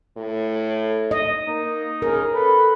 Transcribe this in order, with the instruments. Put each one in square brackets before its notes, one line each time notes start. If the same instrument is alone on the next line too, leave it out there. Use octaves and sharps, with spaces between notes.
[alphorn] A2
[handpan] D#5
[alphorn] A#3 [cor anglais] D#4
[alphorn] C#3 [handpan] A#4
[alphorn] A4 [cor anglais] B4